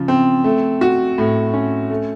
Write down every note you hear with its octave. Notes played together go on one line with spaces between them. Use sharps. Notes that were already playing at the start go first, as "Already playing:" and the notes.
Already playing: C#3 F3 F4
C4
A3
F#4
A2
C#4
A3